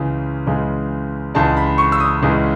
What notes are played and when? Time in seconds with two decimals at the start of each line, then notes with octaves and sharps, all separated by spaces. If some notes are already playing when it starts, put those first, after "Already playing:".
Already playing: C#2 C#3 E3 G#3
0.47 C#2 C#3 E3 G#3
1.35 C#2 C#3 E3 G#3 A5
1.57 B5
1.78 C#6
1.92 E6
2.00 D#6
2.23 C#2 C#3 E3 G#3